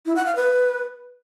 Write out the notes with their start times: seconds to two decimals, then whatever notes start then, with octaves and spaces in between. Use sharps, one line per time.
0.06 E4
0.16 F#5
0.26 F5
0.36 B4